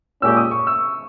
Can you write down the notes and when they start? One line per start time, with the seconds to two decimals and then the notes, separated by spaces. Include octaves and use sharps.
0.22 A#2 G#3 C#4 G4 E6
0.37 D#6
0.51 C#6
0.67 E6